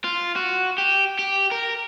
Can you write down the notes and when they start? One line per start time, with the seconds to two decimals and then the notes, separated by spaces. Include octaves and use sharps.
0.04 F4
0.36 F#4
0.78 G4
1.19 G4
1.51 A#4